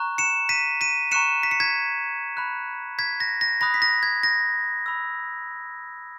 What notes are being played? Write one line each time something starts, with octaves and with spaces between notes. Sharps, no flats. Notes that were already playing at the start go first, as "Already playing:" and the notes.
Already playing: A#5 C#6 F#6
C#7 E7
B6 D#7
B6 D#7
A#5 C#6 F#6 C#7 E7
B6
C#7
G#6 B6
B5 F#6
G#6 B6
A#6
A#6
B5 D#6 F#6 A#6
B6
A#6
G#6
A#6
B5 E6